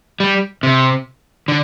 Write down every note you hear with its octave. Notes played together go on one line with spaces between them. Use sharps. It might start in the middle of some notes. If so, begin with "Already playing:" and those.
G3
C3
D3